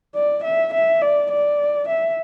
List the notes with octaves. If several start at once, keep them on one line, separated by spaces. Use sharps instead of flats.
D5
E5
E5
D5
D5
E5